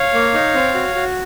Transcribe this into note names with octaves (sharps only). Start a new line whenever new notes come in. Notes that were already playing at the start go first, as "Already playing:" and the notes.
Already playing: C#5 F5
A#3
D#4
C4
F#4
F#4